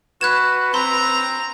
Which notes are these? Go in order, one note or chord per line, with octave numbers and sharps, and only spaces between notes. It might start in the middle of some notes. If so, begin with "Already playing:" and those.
F#4 B4 F#6 G#6 E7
C4 A#5 C6